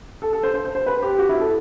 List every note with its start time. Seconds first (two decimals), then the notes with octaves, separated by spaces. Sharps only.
0.22 A4
0.33 A4
0.43 C5
0.54 C5
0.65 C5
0.75 C5
0.86 B4
1.02 G4
1.18 F#4
1.29 E4
1.39 A4